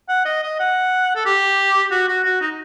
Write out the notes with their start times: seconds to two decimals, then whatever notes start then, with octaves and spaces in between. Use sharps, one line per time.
0.09 F#5
0.25 D#5
0.43 D#5
0.60 F#5
1.15 A4
1.26 G4
1.91 F#4
2.09 F#4
2.25 F#4
2.41 D#4